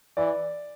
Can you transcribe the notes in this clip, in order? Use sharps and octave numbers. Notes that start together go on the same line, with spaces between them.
E3 D5